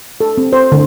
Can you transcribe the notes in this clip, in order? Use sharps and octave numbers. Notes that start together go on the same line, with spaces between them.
A4
C4
C5
D3